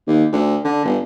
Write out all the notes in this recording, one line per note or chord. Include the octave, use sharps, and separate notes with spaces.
D#2
D2
D3
G1